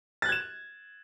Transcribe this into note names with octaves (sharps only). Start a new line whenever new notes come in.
F#6 G#6 A6 E7